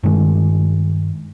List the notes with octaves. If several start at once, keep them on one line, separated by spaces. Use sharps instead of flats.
G2 D#3 G#3